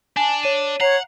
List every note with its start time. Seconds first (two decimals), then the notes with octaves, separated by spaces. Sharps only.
0.17 D4 G#5 A5
0.43 C#5 D#7
0.81 C#5 F#5 A#5 C7 F7